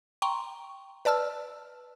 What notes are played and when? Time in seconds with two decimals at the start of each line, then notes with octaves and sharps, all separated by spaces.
0.22 G5 A#5 C6 C#6
1.05 B4 D5 A5 E6 F6